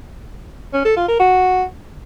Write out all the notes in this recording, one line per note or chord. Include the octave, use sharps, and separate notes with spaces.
C#4
A4
F4
A#4
F#4